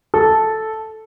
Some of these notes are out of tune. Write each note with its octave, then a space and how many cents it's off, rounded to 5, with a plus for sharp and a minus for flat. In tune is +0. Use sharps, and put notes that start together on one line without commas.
A4 -5